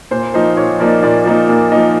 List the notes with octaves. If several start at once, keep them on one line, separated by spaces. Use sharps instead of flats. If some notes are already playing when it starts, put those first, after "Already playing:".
A#2 C5
F3 A#3 D#4 C5
A#2 C#5
F3 A#3 D#4 D5
A#2 D5
F3 A#3 D#4
A#2
F3 A#3 D#4